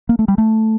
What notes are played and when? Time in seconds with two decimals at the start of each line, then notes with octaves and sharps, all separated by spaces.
0.09 A#3
0.19 A3
0.28 G3
0.38 A3